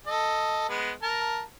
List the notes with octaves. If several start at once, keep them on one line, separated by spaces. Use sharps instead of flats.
A4 D#5
G#3 B3
A#4 A5